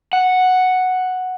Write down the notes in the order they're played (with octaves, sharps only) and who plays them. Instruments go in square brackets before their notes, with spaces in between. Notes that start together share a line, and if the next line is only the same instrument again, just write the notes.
[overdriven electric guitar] F#5